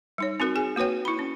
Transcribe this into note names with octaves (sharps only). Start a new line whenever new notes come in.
G3 D#4 C#5
C4 D#4 F#4 A#4
G#4 G#5
A#3 F#4 B4 C#5 G5
E4 B5
C#4